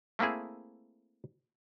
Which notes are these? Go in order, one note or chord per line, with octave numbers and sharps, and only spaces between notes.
A3 A#3 C4 E4 G#4